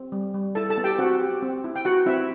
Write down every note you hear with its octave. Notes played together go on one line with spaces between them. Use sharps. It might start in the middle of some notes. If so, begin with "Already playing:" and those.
Already playing: C4
G3
G3
E4 A4 A5
A4 A5
B3
G4 G5
C4 F#4 F#5
G4
C4
E4
G5
F#4 F#5
C4 E4 E5